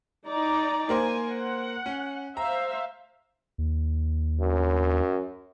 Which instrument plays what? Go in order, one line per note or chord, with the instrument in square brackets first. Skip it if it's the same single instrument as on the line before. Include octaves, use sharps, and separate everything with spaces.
[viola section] D#4 D5 A#5
[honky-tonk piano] A#3 A#4 C5 [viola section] G#5
[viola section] F#5
[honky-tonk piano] C#4
[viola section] C5 E5 F5 [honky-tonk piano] A#5
[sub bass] D#2
[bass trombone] F#2